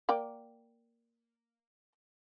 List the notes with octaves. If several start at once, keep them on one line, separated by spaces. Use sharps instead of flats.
A#3 D5 G5